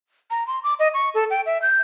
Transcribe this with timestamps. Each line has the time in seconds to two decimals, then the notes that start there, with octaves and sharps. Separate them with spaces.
0.31 A#5
0.47 C6
0.63 D6
0.79 D#5
0.94 C#6
1.14 A4
1.30 G5
1.46 E5
1.62 G6